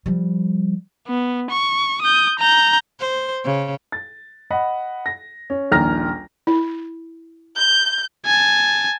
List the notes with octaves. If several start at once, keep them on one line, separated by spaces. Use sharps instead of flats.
F3 G3
B3
C#6
D#6 G6
A#5 G6
C5
C#3
A6
D#5 F#5 B5
A#6
C#4
D#1 A#1 D#2 A#5 F6 A#6
E4
G6
G#5 A5